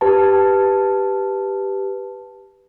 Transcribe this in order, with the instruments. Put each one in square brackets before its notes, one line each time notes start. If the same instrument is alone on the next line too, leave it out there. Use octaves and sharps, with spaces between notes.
[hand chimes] G4 B4 A5